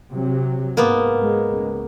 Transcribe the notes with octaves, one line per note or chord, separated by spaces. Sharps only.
C3 F#3
G#2 A#3 B3
G#3
C#2